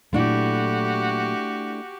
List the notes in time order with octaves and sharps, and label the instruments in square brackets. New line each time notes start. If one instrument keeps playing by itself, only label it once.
[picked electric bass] A#2 F#3 [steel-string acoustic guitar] A3 D4 E4 [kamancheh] F#4 G4